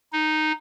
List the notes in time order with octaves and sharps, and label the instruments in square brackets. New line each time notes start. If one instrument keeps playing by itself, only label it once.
[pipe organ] D#4